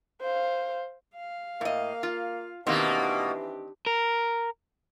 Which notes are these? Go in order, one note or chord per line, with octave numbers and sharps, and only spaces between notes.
C5 F5
F5
A2 A#3 D#5
F4
B2 D#3 E3 A#3 C4 D4 G4
A#4